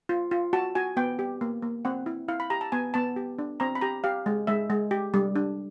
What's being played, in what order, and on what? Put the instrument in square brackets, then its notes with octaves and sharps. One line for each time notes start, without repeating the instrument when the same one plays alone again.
[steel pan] F4
F4
F#4 A5
F#4 G#5
B3 G5
G4
A#3
A#3
C4 F#5
E4
E4 F5
B5
G4 A#5
A5
B3 G#5
B3 A5
G4
D4
C4 A#5
B5
G4 A#5
G4 F5
G#3
G#3 E5
G#3
G4
G3
D4